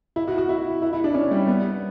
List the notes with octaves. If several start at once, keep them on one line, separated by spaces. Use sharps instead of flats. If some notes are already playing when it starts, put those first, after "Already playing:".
E4
F#4
F#4
E4
E4
E4
D4
C#4
G3
B3